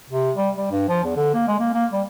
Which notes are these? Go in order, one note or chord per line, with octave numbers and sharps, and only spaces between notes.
C3
G3
G3
G2
F3
E2
D3
A#3
G#3
A#3
A#3
G3